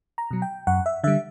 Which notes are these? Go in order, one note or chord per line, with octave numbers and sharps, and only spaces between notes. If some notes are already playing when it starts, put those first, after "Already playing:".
A#5
B2 F#3
G5
F#2 F#5
E5
D3 G3 E5